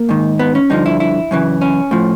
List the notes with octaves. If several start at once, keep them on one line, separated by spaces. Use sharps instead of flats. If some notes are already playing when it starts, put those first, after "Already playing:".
Already playing: A#3
G#2 D#3
B3
C#4
G2 D3 F3 D#4
E4
E4
F#2 C#3 E3
C#4
A2 F3